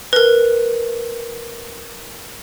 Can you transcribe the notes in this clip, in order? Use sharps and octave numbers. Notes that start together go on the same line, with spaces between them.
A#4 B4